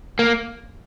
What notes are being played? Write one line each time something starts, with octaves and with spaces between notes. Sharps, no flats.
A#3